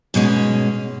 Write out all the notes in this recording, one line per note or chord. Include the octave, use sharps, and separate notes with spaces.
G#2 B2 G#3 C#4